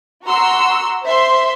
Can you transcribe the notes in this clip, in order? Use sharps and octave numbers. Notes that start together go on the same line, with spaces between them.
F#4 A#5 C6 E6
C5 E5 C6